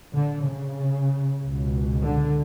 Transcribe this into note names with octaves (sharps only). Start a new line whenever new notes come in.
D3
C#3
C#2 B2
D3